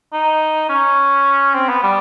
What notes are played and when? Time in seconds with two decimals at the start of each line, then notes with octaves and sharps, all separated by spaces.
0.13 D#4
0.69 C#4
1.54 C4
1.69 B3
1.83 G3